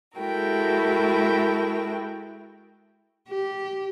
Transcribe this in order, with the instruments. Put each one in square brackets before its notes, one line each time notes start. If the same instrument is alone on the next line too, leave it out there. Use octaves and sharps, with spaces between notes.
[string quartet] G#3 E4 F#4 A4 A#4 G5
[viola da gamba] G4